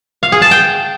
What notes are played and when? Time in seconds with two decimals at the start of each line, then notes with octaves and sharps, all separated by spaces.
0.23 F5
0.32 G#4
0.42 A5
0.51 G5